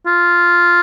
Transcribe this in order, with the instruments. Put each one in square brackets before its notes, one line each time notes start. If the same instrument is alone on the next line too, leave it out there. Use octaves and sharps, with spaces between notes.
[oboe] F4